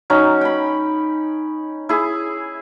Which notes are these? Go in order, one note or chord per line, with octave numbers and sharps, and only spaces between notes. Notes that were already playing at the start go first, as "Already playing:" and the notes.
F#3 C#4 D#4
G5 B5
E4 G#4